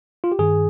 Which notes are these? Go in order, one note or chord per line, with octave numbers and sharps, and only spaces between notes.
F4
G4
G2 D#3 G#4